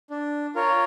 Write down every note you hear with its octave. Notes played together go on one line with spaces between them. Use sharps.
D4
F4 A#4 C#5